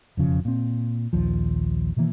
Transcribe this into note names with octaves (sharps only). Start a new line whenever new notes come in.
E1 F2 C#3 F3
A#2 C4
A#1 D#2 F3
B2 D#3 E3 A#3